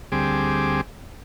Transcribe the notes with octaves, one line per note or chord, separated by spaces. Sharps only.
D2 G3 C4 G#4 D6